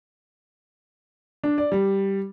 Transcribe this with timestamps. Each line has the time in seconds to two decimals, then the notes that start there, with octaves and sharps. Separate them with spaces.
1.44 D4
1.58 D5
1.72 G3